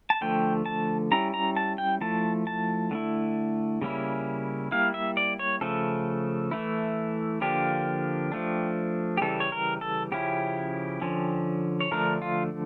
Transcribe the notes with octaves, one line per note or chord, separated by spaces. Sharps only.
A5
D3 F3 A3 G5
A5
G3 C#4 E4 A#5
A#5
A5
G5
F3 A3 E4 A5
A5
D3 A3 E4
C#3 G3 A#3 C#4 E4
G3 A#3 E4 F5
E5
D5
C#5
C#3 F3 A3 A4
E3 A3 E4
D3 F3 A#3 D4 G4
F3 A3 D4
G4
C#3 E3 G3 A4
C#5
A#4
A4
C#3 F3 C#4 E4 G4
D3 F3 C#4
C#5
D3 F3 A3 D4 A#4
F4